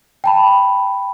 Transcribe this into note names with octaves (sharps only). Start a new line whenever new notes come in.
G5 A5 B5